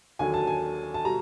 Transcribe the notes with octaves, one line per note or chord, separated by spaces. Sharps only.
D#2 D3 F#3 G#5
A5
G#5
A5
B2 G3 A#5